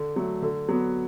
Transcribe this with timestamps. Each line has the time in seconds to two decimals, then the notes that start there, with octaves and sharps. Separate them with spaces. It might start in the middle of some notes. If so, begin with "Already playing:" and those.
Already playing: D3
0.16 F#3 A3
0.42 D3
0.69 F#3 B3